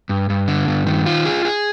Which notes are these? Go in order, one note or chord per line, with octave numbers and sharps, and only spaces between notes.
G2
G2
D3
G2
D#3
F4
G#4
G#4